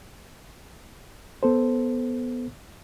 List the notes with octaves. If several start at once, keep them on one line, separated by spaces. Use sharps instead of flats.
B3 A4 C5